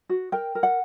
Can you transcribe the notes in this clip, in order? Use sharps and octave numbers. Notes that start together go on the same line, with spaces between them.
F#4
A#4 G5
A#4
F#5